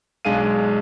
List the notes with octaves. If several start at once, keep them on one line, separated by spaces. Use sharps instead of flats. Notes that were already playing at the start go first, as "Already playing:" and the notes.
B1 G#3 D4 G#4 F5 D#7